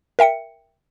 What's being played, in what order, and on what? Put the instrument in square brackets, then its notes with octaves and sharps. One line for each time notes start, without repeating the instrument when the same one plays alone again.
[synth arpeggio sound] A#4 E5 G5 C#7